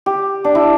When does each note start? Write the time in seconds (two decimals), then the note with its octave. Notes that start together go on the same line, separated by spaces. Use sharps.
0.06 G4
0.44 D4
0.55 E4